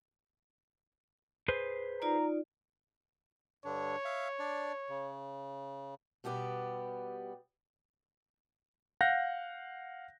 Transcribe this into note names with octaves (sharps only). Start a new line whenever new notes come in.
G#4 B4 C5
D#4 F4 D5 A#5
G2 D3 D4 C#5
E5 F5
D4 D5
C#3
B2 G3 B3 G4
F5 F#5 F#6 G6 A#6